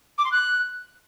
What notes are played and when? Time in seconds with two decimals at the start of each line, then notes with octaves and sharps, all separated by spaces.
0.18 D6
0.25 C6
0.32 F#6